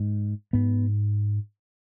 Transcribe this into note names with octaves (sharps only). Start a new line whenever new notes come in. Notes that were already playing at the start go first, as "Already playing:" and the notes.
Already playing: G#2
G#2 B3